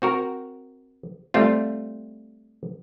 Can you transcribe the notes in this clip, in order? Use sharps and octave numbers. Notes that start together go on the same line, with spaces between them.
C4 F#4 A#4
G3 A3 C4 F4